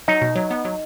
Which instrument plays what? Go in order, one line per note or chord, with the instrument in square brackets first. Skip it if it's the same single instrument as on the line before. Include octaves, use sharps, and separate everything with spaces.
[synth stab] F#3 [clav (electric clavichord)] D#4
[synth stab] B2
F#3
B3
F#3